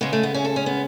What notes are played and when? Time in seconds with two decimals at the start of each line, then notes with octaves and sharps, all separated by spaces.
0.01 C#3 G#3 B3
0.13 A3
0.23 B3
0.34 C#4
0.45 A4
0.56 C#4
0.66 B3